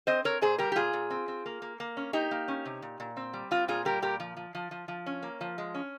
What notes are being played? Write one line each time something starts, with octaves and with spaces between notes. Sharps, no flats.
C4 C5 D#5
C4 A#4 C#5
A#2 G#4 C5
G3 G4 A#4
G4
A#2 F4 G#4
A#2
C4
C4
A#3
A#3
A#3
C#4
A#3 D#4 G4
A#3
C#4
C3
A#2
A#2
C4
G3
C4 F4
A#2 F4 G#4
G3 G4 A#4
A#2 G4 A#4
F3
F3
F3
F3
F3
C#4
A#3
F3
G#3
C#4